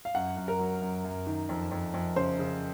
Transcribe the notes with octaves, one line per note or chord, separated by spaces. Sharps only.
F5
F#2 F#5
F#2
A#4
F#3
F#2
F#2
D#3
F2
F2
F2
C#3 C5
C#3